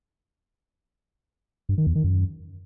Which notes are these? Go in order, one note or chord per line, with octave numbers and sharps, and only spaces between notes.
G2
D#3
E2
D#3
F#2